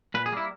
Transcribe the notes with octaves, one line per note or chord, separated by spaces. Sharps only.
A#2 B4
G#4
G3 A#3 E4